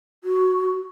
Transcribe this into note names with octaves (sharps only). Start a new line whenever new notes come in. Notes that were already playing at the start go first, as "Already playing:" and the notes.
F#4